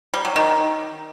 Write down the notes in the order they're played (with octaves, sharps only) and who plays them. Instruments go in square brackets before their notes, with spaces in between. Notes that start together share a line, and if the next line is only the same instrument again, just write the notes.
[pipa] G3
F#3
D#3